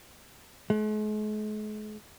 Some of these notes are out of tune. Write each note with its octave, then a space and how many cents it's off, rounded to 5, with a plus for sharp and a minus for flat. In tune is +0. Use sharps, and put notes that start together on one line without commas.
G#3 +45